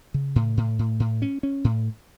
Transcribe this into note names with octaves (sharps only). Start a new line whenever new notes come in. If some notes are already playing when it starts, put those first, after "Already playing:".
C#3
A2
A2
A2
A2
C#4
C#4
A2